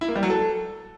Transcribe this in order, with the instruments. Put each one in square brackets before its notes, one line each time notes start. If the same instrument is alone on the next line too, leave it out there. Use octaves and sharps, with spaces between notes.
[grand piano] E4
A#3
G3
F#3
A4